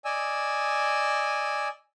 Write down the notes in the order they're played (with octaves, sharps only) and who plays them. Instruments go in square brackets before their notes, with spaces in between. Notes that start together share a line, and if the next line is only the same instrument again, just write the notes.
[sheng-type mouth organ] D5 D#5 G#5 E6